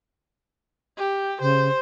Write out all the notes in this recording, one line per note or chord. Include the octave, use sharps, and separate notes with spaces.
G4
C#3 C5